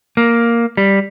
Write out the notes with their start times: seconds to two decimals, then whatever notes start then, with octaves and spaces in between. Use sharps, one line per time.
0.17 A#3
0.77 G3